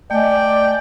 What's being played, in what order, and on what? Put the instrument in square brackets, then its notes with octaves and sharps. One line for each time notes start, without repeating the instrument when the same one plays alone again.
[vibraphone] A3 D#5 G#5 [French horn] D5 [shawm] G5